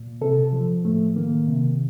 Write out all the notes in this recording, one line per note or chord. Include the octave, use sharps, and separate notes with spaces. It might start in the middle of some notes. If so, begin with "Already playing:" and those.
Already playing: A#2
C3 A4
F3
A2 A3
D#3 A#3
C3